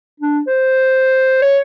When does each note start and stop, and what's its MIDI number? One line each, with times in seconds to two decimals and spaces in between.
0.20 0.40 62
0.47 1.40 72
1.42 1.58 73